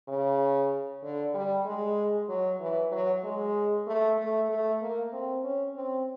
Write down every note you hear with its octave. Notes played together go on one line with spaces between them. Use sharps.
C#3
D3
G3
G#3
F#3
E3
F#3
G#3
A3
A3
A3
A#3
C4
C#4
C4